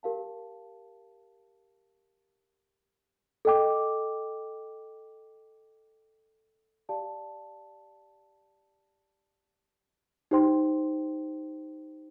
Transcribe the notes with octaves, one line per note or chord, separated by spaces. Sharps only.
G4 A#4 F5 A5
A4 D#5 G5 D6
G4 D5 F5 A5
D#4 G4 C5 G5 C6